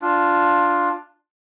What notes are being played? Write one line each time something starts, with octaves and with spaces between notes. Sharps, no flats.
D4 F4